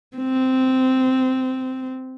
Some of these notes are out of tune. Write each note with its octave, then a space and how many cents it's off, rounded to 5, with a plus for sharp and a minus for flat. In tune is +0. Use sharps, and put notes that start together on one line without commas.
C4 -10